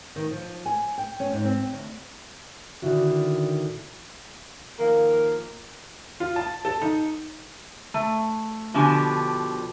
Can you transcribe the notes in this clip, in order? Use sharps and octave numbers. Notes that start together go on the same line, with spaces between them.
D#3
F3
G#5
G5
C#4
G#2
C4
D2
A#2 D3 D#3 E4 F#4
D#3 F3 A#3
F4
A5
A4
D#4
A3
B2 D3 F3 G4 G#5